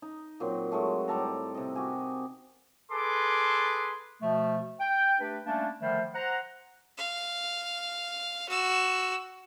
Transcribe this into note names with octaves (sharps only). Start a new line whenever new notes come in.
D#4
A#2 F#3 C4
F#3 G#3 A3
A2 G3 A4 A#5
C3 D#5
F#4 G4 G#5
G#4 A4 B4 C6 D6
B2 F3 A3
G5
A3 D4 G4 B4
G3 A3 A#3 C#4 D4
D3 D#3 F3 G3 A3 C5
C5 F#5 A#5
F5
F#4 E6